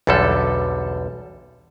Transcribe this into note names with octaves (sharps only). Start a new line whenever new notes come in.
B1 E2 D3 G3 A4